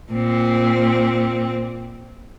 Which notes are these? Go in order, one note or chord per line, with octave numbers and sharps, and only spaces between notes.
A#2 C4